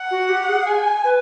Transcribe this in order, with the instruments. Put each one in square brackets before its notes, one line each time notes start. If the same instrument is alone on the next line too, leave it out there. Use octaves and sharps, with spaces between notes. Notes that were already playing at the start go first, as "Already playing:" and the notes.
Already playing: [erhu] F#5
[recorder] F#4
G4
G#4
[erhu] G#5
[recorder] B4